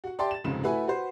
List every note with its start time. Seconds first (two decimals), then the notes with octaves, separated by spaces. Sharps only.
0.04 F#4 F#5
0.19 G4 D5 E5 G5 A5 C6
0.31 A6 E7
0.44 F1 C#2 G#2 C#3 C4 E7
0.63 A3 E4 F#4 B4 E5 G#5
0.87 F#4 B4 C5